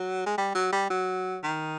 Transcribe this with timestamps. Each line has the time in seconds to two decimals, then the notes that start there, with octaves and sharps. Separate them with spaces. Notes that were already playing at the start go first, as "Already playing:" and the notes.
Already playing: F#3
0.26 G#3
0.38 G3
0.55 F#3
0.73 G3
0.90 F#3
1.43 D#3